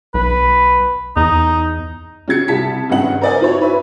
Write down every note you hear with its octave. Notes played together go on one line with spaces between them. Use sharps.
B1 B4
E2 D#4
C#3 F#4 G#6 C#7
C2 G3 E4 A5 B6 C#7
G#1 G2 C#3 D#5 F#5 F#7
A#4 C5 D5 D#5 G#5
D#4 E4 F#4 C5 C#5
E4 B4 E5